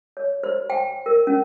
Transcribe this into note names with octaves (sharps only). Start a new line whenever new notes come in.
C#5
C5
G5
A#4
C#4